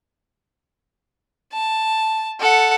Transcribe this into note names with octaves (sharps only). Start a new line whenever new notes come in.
A5
A4 F#5